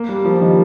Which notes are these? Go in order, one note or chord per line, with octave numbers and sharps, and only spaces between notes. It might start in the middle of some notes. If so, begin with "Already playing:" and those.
Already playing: A#3
G3
F3
G3
D#3